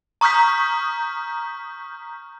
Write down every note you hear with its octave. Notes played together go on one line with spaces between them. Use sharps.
A#5 C#6 D#6 F6 G6 B6